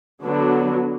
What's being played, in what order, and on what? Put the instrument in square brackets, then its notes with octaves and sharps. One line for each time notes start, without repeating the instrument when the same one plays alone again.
[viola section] D3 F#3 B3 D4